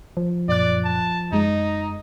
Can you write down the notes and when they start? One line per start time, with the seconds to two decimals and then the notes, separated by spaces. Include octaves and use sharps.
0.17 F3
0.49 F#2 A#2 D5 F#6
0.85 A5
1.32 F#2 G#3 D#4